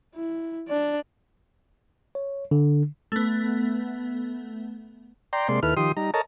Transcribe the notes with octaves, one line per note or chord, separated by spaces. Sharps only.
E4
D4 D5
C#5
D3
A3 B3
D5 G5 A#5 C6
C3 G#3 A#3 D5 C6
D#2 E4 A4 B4 F6
D#3 F3 G4 C6 D#6
G3 D#4 A#5
A4 A#4 C#5 D#5 A5 A#5